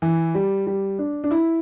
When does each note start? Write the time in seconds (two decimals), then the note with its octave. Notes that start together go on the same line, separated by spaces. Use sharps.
0.02 E3
0.35 G3
0.67 G3
0.99 D4
1.24 D4
1.31 E4